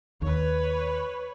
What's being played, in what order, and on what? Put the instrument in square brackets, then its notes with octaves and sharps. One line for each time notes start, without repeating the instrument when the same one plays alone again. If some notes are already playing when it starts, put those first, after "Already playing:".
[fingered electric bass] D#2 [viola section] B4 C#5